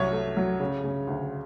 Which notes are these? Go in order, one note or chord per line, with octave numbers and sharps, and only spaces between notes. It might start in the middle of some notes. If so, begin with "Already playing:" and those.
Already playing: C2 F#3 C#5
A3
F#3
C#3
C#3
D2